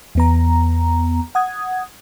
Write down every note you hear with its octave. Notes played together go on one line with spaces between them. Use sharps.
E2 B3 A#5
F#5 D#6 G#6